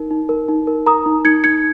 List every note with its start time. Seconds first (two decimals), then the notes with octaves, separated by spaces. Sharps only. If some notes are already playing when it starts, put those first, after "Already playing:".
Already playing: D#4 A#4
0.11 D#4
0.29 A#4
0.49 D#4
0.67 A#4
0.86 A#4 A#5 D#6
1.06 D#4
1.25 D#4 G#6 C#7
1.44 D#4 G#6 C#7